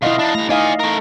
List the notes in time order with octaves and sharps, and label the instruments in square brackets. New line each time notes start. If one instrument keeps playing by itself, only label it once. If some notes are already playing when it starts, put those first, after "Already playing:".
[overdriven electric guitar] B2 F4 [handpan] E4 D#5 F5
[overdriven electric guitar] D4 D#4
[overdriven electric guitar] G2 A#5 [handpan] A3
[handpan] D#4 D#5 F5 [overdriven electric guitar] D5 G#5
[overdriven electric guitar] A3 A#4